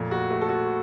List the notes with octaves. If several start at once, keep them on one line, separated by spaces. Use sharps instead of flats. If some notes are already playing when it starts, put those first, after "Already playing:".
Already playing: F2 A#2 A3
F#4
A3
A4
F#4